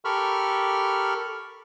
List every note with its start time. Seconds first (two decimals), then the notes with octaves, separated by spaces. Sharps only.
0.05 G4 A4 A#4 B5 C#6 F6